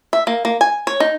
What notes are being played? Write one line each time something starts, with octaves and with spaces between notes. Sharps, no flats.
E5
A#3
A#3
G#5
C#5
D#4